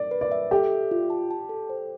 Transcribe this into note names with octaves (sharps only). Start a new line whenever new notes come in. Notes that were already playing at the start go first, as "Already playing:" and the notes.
Already playing: D5
B4
D5
E5
G4 A4
E5
F4
A5
A5
A4
C5